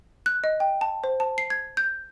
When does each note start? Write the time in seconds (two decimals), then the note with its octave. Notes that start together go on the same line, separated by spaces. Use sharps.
0.26 F#6
0.44 D#5
0.60 G5
0.81 A5
1.04 C5
1.20 A5
1.38 C7
1.50 G#6
1.77 G6